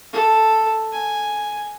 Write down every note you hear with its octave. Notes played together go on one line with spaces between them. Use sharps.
A4
G#5